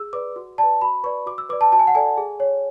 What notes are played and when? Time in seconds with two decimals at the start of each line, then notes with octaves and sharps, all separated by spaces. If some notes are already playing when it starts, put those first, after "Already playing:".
Already playing: G#4 E6
0.13 B4 D5 D6
0.36 F#4
0.58 D5 A5
0.63 B4
0.81 F#4 B5
1.04 B4 D5 C#6
1.26 F#4 D6
1.38 E6
1.49 B4 D5 D6
1.61 A5
1.72 F#4 A5
1.79 G#5
1.87 F#5
1.95 A4 D5 G#5
2.17 G#4
2.40 C#5